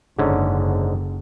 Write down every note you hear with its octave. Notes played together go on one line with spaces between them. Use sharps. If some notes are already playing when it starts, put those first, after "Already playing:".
F#1 G#2 D3 C#4